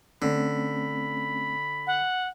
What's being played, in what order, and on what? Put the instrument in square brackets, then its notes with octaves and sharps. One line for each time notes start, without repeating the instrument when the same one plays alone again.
[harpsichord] D3 [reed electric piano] A3 C4 C#4 [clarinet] B5
[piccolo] F#5